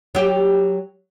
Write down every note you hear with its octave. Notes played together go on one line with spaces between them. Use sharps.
F#3 G4